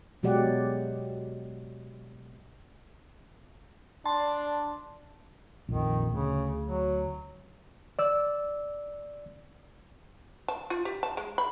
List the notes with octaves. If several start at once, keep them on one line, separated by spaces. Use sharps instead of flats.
B2 F#3 G#3 G4 D5 F#5
D4 A5 C6
A#1 F2 D#3
D2 C#3
F#3
D5 E6
A5
F4
G4
A5
G#3
B5